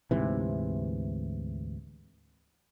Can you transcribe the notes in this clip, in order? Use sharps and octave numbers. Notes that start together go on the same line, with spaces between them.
D2 G#2 C3 E3